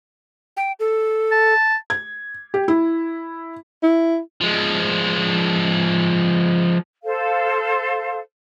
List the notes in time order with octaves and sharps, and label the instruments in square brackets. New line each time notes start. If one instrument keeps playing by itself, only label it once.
[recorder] G5
A4
[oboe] A5
[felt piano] G#6
G4
E4
[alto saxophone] E4
[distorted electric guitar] F3 G#3
[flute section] A4 C5 F5